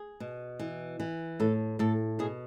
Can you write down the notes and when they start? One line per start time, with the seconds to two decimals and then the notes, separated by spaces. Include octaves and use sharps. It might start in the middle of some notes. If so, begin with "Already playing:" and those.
Already playing: G#4
0.20 B2
0.59 E3
1.00 E3
1.40 A2 A4
1.79 A2 A4
2.19 B2 G#4